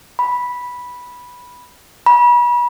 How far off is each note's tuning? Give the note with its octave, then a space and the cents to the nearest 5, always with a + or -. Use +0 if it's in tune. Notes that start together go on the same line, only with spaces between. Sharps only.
B5 -10
B5 -35